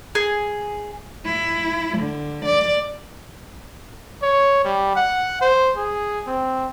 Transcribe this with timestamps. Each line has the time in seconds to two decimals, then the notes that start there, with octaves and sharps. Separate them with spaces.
0.15 G#4
1.25 E4
1.98 D3
2.45 D5
4.23 C#5
4.65 G3
4.96 F#5
5.41 C5
5.77 G#4
6.27 C4